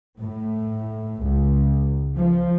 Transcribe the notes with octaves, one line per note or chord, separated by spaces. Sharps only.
A2
C#2
F3